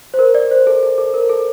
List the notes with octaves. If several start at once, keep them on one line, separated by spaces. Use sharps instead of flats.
C5
A#4
D5
C5
A4
A4
A4
A#4
A4